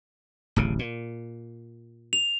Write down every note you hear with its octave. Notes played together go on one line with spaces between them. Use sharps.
D1 A1 C#3
A#2
F7